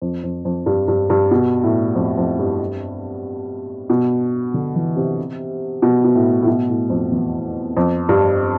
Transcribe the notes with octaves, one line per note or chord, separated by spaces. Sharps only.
F2
F2
F2
G2
G2
G2
B2
A2
F2
F2
G2
B2
D3
E3
C3
B2
B2
A2
A2
B2
A2
F2
E2
F2
G2